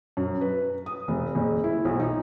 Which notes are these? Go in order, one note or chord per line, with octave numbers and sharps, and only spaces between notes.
F#2
B4
D#6
F1
F#1
E4
B1
D#4